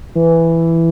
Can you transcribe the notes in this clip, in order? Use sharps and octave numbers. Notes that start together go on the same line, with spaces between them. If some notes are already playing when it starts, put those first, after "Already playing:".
E3